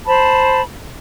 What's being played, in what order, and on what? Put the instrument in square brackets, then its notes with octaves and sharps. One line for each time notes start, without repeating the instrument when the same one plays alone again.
[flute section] C5 A5 B5